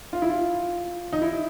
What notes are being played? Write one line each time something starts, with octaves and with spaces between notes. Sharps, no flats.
F4
E4
F4
D#4
E4